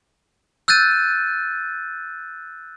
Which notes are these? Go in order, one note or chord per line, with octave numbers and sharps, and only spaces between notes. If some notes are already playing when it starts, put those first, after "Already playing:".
E6 F#6 G6 A6 D#7